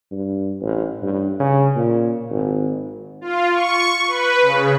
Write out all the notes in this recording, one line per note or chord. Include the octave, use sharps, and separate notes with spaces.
G2
A1
G2
C#3
A#2
G#1
F4
C#6
B4
C#3